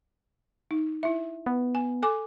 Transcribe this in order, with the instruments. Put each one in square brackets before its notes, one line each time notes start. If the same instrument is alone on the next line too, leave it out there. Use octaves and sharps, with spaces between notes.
[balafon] D#4
E4 E5
[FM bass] B3
[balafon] G#5
A4 G#5 D6